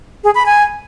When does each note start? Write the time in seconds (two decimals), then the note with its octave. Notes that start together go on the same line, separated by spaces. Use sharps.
0.24 G#4
0.35 B5
0.46 G#5